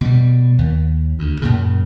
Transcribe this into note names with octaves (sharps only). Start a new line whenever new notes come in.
B2 G3
D#2
D2
F#2 A#2 C#3